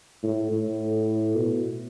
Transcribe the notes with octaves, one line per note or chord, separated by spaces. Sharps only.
A2
A2
B2